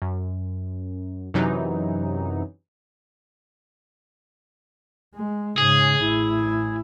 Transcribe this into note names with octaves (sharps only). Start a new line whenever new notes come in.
F#2
F#2 C3 E3 F#3 D#4
G#3
G#2 C#3 G#4
A1 E4